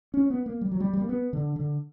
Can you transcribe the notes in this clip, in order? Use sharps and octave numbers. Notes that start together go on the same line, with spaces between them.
C#4
B3
A#3
G3
F#3
G3
G3
A#3
B3
D3
D3